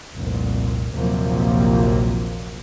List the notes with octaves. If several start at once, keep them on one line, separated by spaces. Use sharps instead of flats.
F1 C2 A#2
A#1 D#2 C3 F3 F#3 A#3